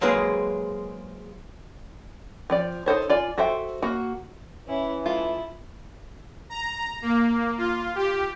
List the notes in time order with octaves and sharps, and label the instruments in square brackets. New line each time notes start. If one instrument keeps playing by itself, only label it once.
[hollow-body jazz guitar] F#3 G#3 A#3 C4 G#4 B4
[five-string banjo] F3 C4 D5
D#4 A4 C5 C#5
F4 D5 G#5
F#4 A4 C5 E5 G5
A#3 F#4
[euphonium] E3 [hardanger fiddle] C#4 E4
[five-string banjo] G#3 F4 A4 [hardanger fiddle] E4
[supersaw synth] A#5
A#3
F4
G4